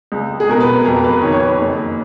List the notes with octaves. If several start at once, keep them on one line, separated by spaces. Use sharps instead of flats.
C#2
G#4
B2 A#4
B4
F2 A#4
B4
D#3 C#5
C#5
B4
F#1